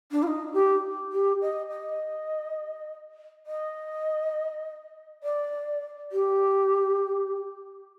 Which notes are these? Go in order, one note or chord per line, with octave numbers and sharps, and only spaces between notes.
D4
F4
D#4
G4
G4
D#5
D#5
D#5
D5
G4